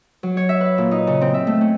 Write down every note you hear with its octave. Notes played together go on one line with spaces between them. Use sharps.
F#3
C#5
E5
B4
A#2
D#4
C#3
C4
E5
A3
C#4